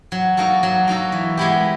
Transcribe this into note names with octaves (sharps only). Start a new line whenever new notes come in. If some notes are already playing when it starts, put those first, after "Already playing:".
F#3
A#3 D#4 F#4 A4
F#3
A#3 D#4 F#4 A4
E3
G#3 B3 E4 G4